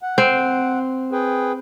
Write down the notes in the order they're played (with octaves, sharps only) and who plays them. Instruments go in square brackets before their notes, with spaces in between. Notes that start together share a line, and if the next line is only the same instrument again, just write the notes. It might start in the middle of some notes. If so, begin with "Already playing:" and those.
[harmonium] F#5
[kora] C4
[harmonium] G#4 B4 G5